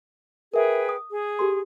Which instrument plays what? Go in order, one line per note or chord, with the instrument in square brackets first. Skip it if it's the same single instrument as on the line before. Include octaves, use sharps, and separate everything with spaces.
[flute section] G#4 B4 G5 [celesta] A#4 E5
[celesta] D#6
[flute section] G#4
[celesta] G4 A4 C6